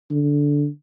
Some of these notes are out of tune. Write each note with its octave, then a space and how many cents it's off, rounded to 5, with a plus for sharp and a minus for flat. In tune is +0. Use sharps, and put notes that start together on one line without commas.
D3 -10